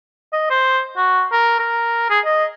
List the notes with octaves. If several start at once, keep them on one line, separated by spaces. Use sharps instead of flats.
D#5
C5
F#4
A#4
A#4
G#4
D#5